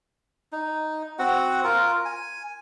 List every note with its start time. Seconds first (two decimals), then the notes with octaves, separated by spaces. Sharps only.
0.52 D#4
1.19 C4 F#4 F#5
1.64 F4 A#4
2.05 G#5